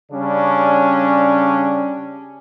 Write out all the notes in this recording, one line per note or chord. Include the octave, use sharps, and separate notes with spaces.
C#3 G3 C#4 D4